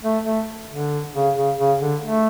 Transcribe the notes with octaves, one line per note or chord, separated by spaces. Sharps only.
A3
A3
D3
C#3
C#3
C#3
D3
A3